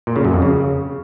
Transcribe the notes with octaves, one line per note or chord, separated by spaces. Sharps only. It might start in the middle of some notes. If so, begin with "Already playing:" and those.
A#2
C#3
F#2
F2
C#3